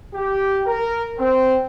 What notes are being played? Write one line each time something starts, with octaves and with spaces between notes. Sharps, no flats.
G4
A#4
C4